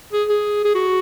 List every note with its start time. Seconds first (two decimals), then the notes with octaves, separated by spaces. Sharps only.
0.13 G#4
0.29 G#4
0.65 G#4
0.75 F#4